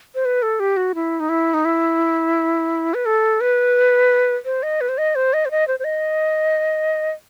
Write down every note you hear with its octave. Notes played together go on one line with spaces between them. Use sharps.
C5
B4
A4
G4
F#4
E4
D#4
E4
D#4
E4
B4
A4
B4
C5
D#5
B4
C5
D#5
C5
D#5
C5
D#5
C5
C5
D#5